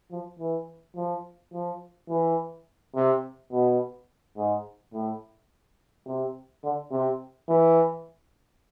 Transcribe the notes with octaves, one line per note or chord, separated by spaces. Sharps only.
F3
E3
F3
F3
E3
C3
B2
G#2
A2
C3
D3
C3
E3